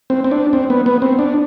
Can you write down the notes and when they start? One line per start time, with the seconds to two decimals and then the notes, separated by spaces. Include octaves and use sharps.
0.10 C4
0.24 C4
0.31 D4
0.53 C4
0.70 B3
0.86 B3
1.02 C4
1.19 D4